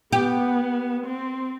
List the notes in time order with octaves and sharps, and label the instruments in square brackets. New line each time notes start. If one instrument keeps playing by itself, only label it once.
[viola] B3 [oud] G4
[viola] C4